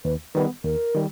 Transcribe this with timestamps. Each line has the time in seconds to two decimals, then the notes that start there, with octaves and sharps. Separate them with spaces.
0.04 D#2 B4
0.35 D#3 G3 B3 B4
0.64 D#2 A#4
0.95 D#3 G3